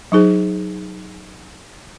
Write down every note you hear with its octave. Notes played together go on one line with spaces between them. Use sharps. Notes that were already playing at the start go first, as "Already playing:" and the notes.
F#3 D#4 G#4 C5